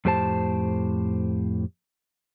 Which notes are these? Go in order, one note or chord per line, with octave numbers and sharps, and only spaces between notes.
F2 A2 G4 C5 A5